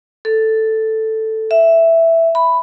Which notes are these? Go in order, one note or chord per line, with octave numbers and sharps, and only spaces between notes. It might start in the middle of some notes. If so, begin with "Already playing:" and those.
A4
E5
B5